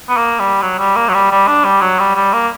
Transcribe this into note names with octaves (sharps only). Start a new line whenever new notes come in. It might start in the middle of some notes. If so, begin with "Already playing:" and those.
B3
A#3
G3
F#3
G3
A#3
F#3
G3
G3
D4
G3
F#3
G3
G3
A#3